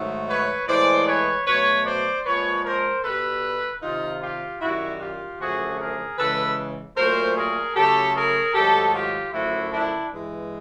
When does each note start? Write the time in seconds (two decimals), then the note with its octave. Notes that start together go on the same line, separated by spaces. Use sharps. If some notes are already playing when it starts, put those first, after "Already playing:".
Already playing: G#2 D#3 F#3 A3
0.29 B4 C#5
0.68 A2 E3 G#3 C5 D5
1.07 B4 C#5
1.46 B2 F#3 A3 B4 C#5
1.86 C5 D5
2.25 A#2 F3 G#3 B4 C#5
2.65 A#4 C5
3.04 B2 G3 A4 B4
3.82 C3 D#3 G3 D#4 F4
4.21 F4 G4
4.61 F#2 D#3 G3 E4 F#4
5.00 F4 G4
5.40 F#2 D3 F3 A3 F#4 G#4
5.79 G#4 A#4
6.18 C#3 E3 G#3 A4 B4
6.97 A#2 F#3 A3 A#4 C5
7.37 G#4 A#4
7.75 C#3 F#3 A3 G4 A4
8.15 G#4 A#4
8.54 G#2 D#3 F#3 A3 G4 A4
8.94 F4 G4
9.33 F#2 D3 F3 A3 E4 F#4
9.72 D4 E4
10.12 G2 E3 G#3